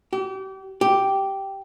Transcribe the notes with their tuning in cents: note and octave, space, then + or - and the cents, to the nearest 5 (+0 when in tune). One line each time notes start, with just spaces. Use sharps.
G4 -35
G4 -5